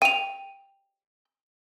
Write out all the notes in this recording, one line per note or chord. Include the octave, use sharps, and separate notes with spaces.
G5 D#7 F7